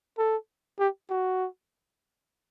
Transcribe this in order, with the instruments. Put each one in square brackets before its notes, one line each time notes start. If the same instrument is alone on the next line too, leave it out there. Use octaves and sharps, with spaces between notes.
[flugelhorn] A4
G4
F#4